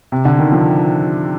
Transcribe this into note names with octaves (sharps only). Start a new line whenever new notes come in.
C3
D3
D#3
F3